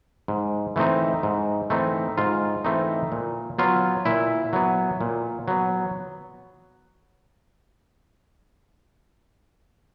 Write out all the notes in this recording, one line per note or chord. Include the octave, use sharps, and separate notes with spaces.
G#2
E3 A3 C4 D#4
G#2
E3 A3 C4 D#4
G#2 F4
E3 A3 C4 D#4
A#2
F#3 B3 F4
A#2 E4
F#3 B3
A#2
F#3 B3